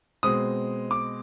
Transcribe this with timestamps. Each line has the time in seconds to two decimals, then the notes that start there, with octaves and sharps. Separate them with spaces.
0.23 B2 G#3 C4 D#6
0.91 D6